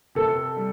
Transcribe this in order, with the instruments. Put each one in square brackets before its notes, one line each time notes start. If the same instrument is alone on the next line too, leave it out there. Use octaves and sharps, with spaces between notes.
[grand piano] C3 [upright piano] A4
[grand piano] G3